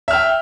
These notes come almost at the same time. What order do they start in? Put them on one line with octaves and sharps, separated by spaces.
E5 F6 G5